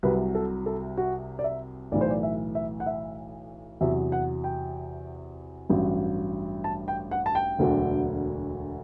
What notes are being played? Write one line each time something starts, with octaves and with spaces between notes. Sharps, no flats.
C2 C3 F#3 B4
A4
A4
F#4
D5
E5
B1 A2 E3 D5
C5
D5
E5
E5
F#5
E5
E2 C3 F#3 E5
F#5
G5
A1 G2 F#3
A5
G5
F#5
A5
G5
E1 D2 D3 F#3